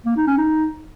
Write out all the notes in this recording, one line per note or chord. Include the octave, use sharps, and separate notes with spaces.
A#3
D#4
C#4
D#4